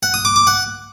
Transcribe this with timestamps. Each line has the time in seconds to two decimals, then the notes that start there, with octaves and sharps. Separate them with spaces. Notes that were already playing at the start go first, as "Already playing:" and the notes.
0.03 F#5
0.14 D#6
0.25 D6
0.36 D6
0.47 F#5